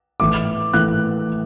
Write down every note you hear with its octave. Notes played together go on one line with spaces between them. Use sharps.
A2 E3 A3 D6
A2 E3 A3 F#6